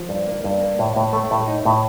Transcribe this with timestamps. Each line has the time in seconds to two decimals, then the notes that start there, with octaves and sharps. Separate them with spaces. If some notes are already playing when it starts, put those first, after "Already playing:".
Already playing: F3
0.09 G2
0.27 A#3
0.44 G2
0.61 A#3
0.79 A2
0.96 A2
1.13 A3
1.31 A2
1.48 D#4
1.65 A2